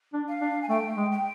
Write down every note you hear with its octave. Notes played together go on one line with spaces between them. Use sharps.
D4
F5
D4
G#5
A3 G5
G#3
G5